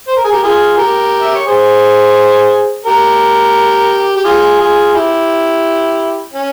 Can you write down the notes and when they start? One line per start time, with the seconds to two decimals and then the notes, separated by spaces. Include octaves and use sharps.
0.08 C5
0.17 A#4
0.24 G#4
0.32 G4 A#4
0.43 F4 G#4
0.77 G4 A#4
1.21 E5
1.35 C#5
1.47 G#4 C5
2.86 G4 A#4
4.16 G4
4.25 F4 G#4
4.60 F4 G#4
4.95 E4 G4
6.33 C#4